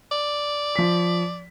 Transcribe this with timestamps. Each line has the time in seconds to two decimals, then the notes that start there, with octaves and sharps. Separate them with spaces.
0.12 D5
0.76 F3 B6